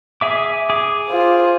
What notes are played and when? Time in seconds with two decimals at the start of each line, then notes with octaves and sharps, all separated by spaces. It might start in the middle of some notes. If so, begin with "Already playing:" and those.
0.21 G#4 E5 D6
0.70 G#4 D6
1.08 F4 C5